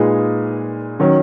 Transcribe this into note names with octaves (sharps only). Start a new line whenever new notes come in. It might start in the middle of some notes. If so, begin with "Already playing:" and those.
Already playing: A#2 G#3 D#4 G#4 B4
D#3 F#3 C#4